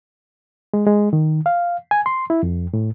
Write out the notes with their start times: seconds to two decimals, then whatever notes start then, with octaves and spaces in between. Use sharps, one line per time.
0.73 G#3
0.86 G#3
1.13 D#3
1.46 F5
1.91 G#5
2.06 C6
2.30 E4
2.43 F2
2.73 A2